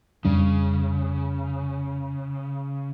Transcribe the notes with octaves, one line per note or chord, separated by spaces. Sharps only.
F2 C#3 G3 D4